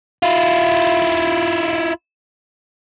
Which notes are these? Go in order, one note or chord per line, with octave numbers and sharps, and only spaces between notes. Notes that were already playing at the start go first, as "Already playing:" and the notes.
E4 F4